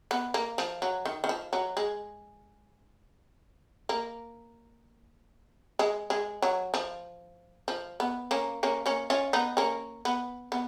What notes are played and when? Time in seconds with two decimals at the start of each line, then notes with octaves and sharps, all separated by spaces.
0.11 B3
0.34 A#3
0.58 F3
0.82 F#3
1.05 D#3
1.24 D#3
1.29 F3
1.53 F#3
1.77 G#3
3.89 A#3
5.79 G#3
6.10 G#3
6.42 F#3
6.74 F3
7.68 F3
8.00 B3
8.31 A#3 C#4
8.63 A#3 C#4
8.86 A#3 C#4
9.10 C#4 F4
9.33 B3 D#4
9.57 A#3 C#4
10.05 B3
10.52 B3